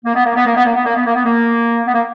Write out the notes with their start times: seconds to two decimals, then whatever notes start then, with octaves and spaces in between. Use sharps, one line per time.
0.05 A#3
0.15 B3
0.25 A#3
0.35 B3
0.45 A#3
0.55 B3
0.65 A#3
0.75 B3
0.85 A#3
0.95 B3
1.05 A#3
1.15 B3
1.25 A#3
1.87 B3
1.93 A#3